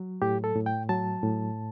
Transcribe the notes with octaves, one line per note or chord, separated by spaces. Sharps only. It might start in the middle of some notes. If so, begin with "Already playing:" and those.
Already playing: F#3
A2 G4
A4
A2
G5
F#3 A5
A2